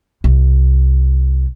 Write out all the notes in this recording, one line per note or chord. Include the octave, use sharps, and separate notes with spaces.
C2